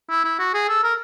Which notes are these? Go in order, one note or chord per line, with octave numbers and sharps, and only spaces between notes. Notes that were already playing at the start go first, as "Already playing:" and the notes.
E4
E4
F#4
G#4
A4
A#4